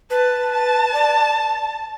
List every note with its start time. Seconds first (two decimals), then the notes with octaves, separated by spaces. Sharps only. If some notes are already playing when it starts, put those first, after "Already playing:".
0.10 B4 A5
0.52 A5
0.94 D5